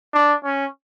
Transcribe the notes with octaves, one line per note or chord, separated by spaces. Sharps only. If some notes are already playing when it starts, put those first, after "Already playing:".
D4
C#4